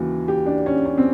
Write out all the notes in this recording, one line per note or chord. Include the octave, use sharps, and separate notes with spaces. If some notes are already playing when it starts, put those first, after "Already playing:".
Already playing: D#2 C#3 E3 F#4
G4
D4
C#4
C#4
C4